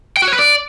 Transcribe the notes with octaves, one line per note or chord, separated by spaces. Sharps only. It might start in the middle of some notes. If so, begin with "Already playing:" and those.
G5
F#4
C#5
B4
D5